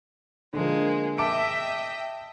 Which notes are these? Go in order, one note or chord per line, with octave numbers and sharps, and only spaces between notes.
D3 F3 G#3 A#3
D#5 E5 G5 A5 D6 D7